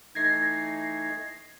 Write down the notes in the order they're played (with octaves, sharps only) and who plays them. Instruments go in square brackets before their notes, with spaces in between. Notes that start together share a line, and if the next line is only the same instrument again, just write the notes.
[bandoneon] E3 A3 D#4 [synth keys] G#6 A#6 C7